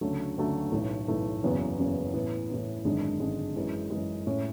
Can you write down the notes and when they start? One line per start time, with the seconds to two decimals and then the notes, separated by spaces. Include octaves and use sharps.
0.01 D2 C#3 F#3 A3 D4
0.37 D2 C#3 F#3 A3 D4
0.72 B1 A2 E3 A3
1.08 B1 A2 E3 A3
1.43 F#1 E2 C#3 F#3 B3
1.79 F#1 E2 C#3 F#3 B3
2.14 A2 E3 B3
2.50 A2 E3 B3
2.85 G#1 F#2 D3 G#3 D4
3.20 G#1 F#2 D3 G#3 D4
3.56 F#2 E3 G#3
3.90 F#2 E3 G#3
4.27 A2 G#3 C#4